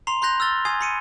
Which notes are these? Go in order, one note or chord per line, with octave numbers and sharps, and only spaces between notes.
A#5 C6 C7 F7
B5 C6 F#6 G6 A#6 F7
E6 F6 A6 G7
G#5 D#6 G#6 C7
B5 C#7 D#7